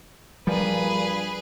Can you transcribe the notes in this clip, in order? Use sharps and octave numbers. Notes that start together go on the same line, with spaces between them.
G2 A#2 F3 G3 G#4 B4